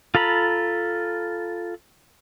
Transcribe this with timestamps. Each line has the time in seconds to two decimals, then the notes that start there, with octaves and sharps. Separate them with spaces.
0.15 F4 A4 A#5 B5